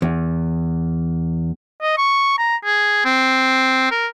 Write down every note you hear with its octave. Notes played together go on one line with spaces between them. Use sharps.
E2
D#5
C#6
A#5
G#4
C4
A#4